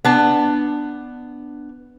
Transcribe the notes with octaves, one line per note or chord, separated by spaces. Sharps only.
B3 D4 A5